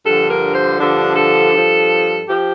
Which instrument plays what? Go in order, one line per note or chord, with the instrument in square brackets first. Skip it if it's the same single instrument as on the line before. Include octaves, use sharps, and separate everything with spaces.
[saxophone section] G2 D3 F3 A4
A#4
C5
G2 D3 F3 D4
A4
G2 F3
F3 G4